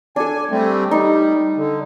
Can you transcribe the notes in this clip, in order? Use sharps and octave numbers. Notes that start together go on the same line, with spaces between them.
D4 A4 G#5
G3 A3 C4
G3 D#4
D3